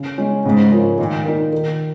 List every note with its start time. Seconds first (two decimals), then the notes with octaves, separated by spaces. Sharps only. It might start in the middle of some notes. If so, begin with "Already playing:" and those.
Already playing: C#3
0.18 G#3 C#4
0.45 G#2 C#3
0.72 F3 A#3 C#4
0.98 A#2 D#3
1.25 A#3 D#4
1.53 D#3